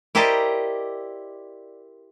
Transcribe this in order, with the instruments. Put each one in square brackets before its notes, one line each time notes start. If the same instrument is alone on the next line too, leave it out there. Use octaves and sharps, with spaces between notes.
[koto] E4 G4 A#4 C5 D5 D#5